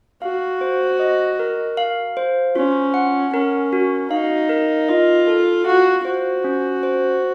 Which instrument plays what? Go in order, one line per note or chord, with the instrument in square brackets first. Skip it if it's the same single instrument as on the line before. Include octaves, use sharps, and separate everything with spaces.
[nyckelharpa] F#4 [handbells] F5
[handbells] C5
D#5
A#4
F5
C5
[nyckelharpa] C#4 [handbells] F4
[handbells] F#5
[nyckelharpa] C#4 [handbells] A#4
[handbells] F#4
[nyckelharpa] D#4 [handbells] F5
[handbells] A#4
[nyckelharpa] F4 [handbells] D#5
[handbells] A4
[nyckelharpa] F#4 [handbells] F5
[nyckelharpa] F#4 [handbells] C5
[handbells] C#4
C5